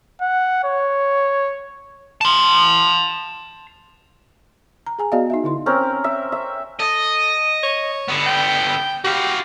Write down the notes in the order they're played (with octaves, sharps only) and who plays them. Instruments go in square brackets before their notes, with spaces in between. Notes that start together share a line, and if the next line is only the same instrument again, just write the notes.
[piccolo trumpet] F#5
C#5
[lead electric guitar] A5 C6
[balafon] A#5
G#4 G#5 A#5
B3 F#4 G#4 D5 D#5 F5
D#4 F#4 E5
D3 E4 C6
[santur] C4 C#4 A#4
E5
E5
[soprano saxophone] A4 [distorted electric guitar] D#5
[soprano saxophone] C#5
[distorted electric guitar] D3 B3
[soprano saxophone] G5
[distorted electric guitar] F#4 F5 [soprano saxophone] G4